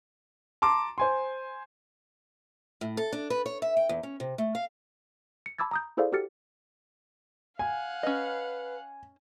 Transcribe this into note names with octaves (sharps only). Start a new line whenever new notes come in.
A5 A#5 C6 D6
C5 G#5 C6
A2
A4
D4
B4
C#5
E5
G5
E2
C#4
C3
A3
F5
C#7
A5 B5 D6 E6 G#6 A6
A#5 D#6 G6
E4 G#4 A4 C5 D5 F5
F#4 G4 A4 F6 A6 C#7
F5 F#5 G#5
C#4 B4 D#5